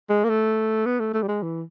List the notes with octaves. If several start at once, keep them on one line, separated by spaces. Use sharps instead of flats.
G#3
A#3
A3
B3
A3
A3
G3
G#3
E3